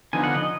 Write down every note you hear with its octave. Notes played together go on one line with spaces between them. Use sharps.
D3 F3 B3 D#4 G#5
F#5
D#5